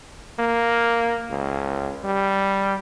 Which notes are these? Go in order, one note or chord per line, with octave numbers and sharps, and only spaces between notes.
A#3
C#2
G3